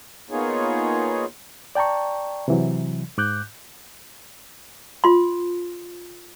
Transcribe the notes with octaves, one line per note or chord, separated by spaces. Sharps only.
A#3 B3 D#4 F4 G#4 C#5
D5 G5 A5 A#5 C#6
C3 E3 F#3
G#2 D6 F#6 G6
F4 C6